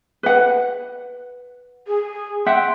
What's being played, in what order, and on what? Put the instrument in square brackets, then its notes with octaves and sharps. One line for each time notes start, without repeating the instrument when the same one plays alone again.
[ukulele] B4 F#5
[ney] G#4
[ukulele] E5 F#5 G5 [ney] C6